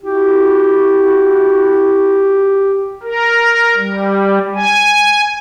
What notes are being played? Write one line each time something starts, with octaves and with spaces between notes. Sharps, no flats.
E4 F#4 G4
A#4
G3
G#5